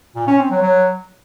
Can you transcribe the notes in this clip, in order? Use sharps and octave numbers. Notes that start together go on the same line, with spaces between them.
A#2
C#4
C4
F#3
F#3